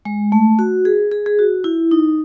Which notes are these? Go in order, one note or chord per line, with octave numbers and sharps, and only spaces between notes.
G#3
A3
F#4
G#4
G#4
G#4
F#4
E4
D#4